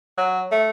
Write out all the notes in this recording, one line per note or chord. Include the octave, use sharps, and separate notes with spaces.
F#3
A3